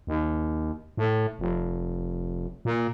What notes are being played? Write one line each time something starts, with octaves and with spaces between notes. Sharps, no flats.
D#2
A2
F1
A#2